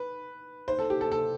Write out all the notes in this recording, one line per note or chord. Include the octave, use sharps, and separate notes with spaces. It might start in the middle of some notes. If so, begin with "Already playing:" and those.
Already playing: B4
C5
A4
G4
A4
A4